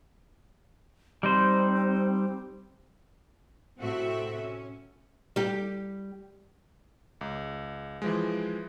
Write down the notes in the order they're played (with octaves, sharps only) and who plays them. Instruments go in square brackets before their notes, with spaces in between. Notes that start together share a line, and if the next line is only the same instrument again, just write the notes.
[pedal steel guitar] G3 D#4 C5 [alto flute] C4
[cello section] A2 C3 C4 F#4 A4 E5
C#4
[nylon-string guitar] G3 G4
[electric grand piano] C#2
E3 F3 G#3